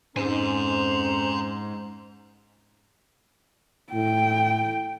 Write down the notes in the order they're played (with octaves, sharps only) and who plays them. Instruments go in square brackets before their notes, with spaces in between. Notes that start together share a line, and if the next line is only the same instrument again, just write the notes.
[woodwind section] F2 C4 C#4 [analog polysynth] G#2 [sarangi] C5 [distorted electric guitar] G#5 A#5
[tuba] A2 [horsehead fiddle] G5